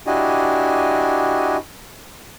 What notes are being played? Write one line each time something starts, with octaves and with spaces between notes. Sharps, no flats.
D4 E4 F#4 G4 D#5 G#5